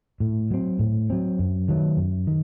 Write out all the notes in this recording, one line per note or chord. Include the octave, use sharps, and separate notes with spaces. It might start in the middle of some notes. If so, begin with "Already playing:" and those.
A2
F#3 C4
A2
F#3 C4
F#2
D#3 F#3 A3
F#2
D#3